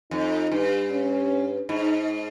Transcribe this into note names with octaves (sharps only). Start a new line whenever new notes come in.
F2 D#4
G2
C#4
G#2 D#4